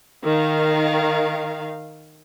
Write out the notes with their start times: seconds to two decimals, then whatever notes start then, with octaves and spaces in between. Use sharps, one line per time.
0.24 D#3 F5